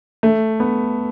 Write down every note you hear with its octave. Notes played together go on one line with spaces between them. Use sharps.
A3
B3